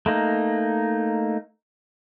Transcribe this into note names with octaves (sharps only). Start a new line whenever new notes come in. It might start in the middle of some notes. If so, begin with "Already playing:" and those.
A3 A#3 D#4